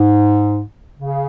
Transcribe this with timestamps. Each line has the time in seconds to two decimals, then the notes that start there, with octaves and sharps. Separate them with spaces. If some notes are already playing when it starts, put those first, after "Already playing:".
Already playing: G#2
0.99 C#3